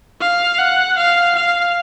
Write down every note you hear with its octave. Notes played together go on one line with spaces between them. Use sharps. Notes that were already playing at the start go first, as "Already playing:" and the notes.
F5
F#5
F5
F5